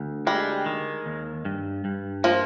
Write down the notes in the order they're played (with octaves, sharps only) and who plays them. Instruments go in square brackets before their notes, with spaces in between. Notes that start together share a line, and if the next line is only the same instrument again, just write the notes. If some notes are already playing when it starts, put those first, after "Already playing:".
Already playing: [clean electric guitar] D2
[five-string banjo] G3 [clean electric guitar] G#3
[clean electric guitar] D#3
D#2
G2
G2
[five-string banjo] F3 [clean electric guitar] A#3